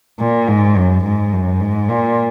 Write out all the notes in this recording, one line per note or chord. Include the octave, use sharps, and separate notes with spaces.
A#2
G#2
F#2
G#2
F#2
G#2
A#2